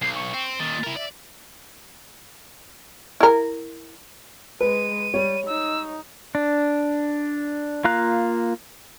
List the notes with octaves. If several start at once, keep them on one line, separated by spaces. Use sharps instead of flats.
B1 C7
C#6
C4
A#2 D#3 A6
E4 A#4
D5 E5
E4 A#4
G#3 B4 D#7
G3 C#5
D#4 E6
D4
A#3 F4 F5 A#5 F#6